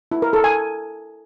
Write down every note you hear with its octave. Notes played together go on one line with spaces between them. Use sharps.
E4
A#4
A4
G#5